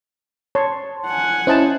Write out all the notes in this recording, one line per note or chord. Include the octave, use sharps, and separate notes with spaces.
C#5 A5 C6
F#5 G#5
C#4 E4 C5 D#5 A5